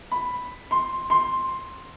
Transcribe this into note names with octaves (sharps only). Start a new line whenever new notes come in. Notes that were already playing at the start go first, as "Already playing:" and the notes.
B5
C6
C6